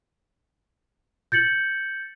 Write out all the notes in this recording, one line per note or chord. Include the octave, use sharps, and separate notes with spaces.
G6 A6 C#7 F#7